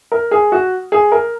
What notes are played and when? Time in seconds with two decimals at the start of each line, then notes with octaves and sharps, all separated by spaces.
0.12 A#4
0.31 G#4
0.52 F#4
0.92 G#4
1.12 A#4